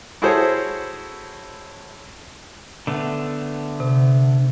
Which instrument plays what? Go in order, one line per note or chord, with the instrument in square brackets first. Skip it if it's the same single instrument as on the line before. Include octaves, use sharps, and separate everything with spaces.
[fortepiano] E4 F#4 G#4 A4 C5 C#5
[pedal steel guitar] D3 A3 B3
[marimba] C3